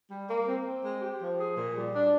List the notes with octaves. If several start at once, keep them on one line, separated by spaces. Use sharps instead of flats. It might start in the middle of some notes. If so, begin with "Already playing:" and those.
G3
A#3
C4
C4
G#3
G4
F3
G#4
A#2
G3
D4